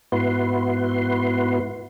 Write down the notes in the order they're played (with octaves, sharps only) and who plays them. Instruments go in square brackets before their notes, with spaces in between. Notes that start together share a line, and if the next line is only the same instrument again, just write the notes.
[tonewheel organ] G#2 B3 E4 F#4 B4 C6